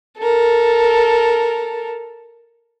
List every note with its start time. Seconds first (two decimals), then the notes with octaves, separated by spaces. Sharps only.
0.17 A4 A#4